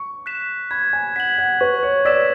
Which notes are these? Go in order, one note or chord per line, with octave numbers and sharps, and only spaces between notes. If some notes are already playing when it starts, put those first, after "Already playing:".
Already playing: C#6
F#6 B6 E7
B5 G#6
G#5
F#5 B6 F#7
F#5
B4 C#6
C#5
D5 E6 B6 E7